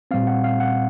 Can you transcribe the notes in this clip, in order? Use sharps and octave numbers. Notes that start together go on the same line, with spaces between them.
A#2 G3 C4 F5
F#5
F5
F#5